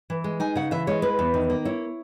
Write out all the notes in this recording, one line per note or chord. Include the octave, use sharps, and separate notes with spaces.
E3
G#3
D#4 G#5
C#3 F#5
E3 E5
G#3 C#5
E4 B4
E2
D#3
A#3
E4 C#5